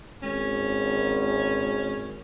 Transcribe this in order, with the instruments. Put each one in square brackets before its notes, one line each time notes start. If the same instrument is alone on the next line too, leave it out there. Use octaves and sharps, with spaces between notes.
[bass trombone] G#1 [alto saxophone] C#4